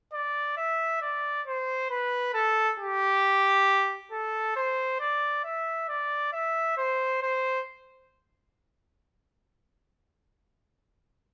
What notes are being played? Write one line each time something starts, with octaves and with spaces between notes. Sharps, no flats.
D5
E5
D5
C5
B4
A4
G4
A4
C5
D5
E5
D5
E5
C5
C5